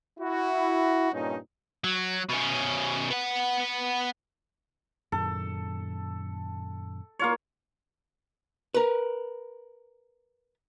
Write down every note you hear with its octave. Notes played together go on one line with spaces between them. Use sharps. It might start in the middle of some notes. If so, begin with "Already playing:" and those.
E4 F#4
G2 A#2 C#4 D#4
F#3
B2 C#4
B3 F#5
F#2 A#2 D#3 A4
A#3 F4 C#5
A#4 B4